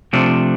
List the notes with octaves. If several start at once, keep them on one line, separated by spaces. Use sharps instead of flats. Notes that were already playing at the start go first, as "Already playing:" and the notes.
C3 F3 A3 D4